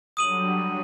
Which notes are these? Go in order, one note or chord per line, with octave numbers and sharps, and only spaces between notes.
D3 F#3 G3 D#6 D#7 F#7